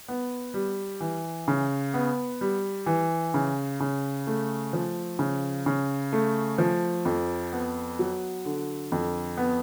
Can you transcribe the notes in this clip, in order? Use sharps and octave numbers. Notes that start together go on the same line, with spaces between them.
B3
G3
E3
C#3
B3
G3
E3
C#3
C#3
A3
F3
C#3
C#3
A3
F3
F2
B3
F#3
D3
F2
B3